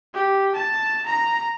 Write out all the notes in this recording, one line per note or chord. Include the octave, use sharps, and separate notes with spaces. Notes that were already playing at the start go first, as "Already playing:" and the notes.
G4
A5
A#5